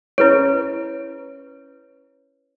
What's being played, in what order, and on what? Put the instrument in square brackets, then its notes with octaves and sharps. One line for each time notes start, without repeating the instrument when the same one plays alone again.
[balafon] C#4 E4 [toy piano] B4 C#5